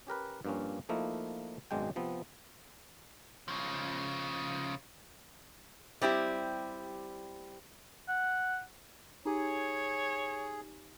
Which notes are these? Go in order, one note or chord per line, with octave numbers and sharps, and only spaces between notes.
C#4 G4 A#4 B4
G2 F3 A#3 C4 C#4
F3 A3 A#3 D#4 E4 A#4
G#1 F#2 B2 G#3 D4 G5
C3 F3 B3 C4
C#3 F3
G3 C4 E4 G4
F#5
D#4 G4 G#4 C#5 G#5